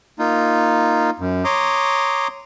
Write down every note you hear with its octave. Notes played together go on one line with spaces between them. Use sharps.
A#3 D#4 F4
F#2
C#5 A#5 C6 D6 D#6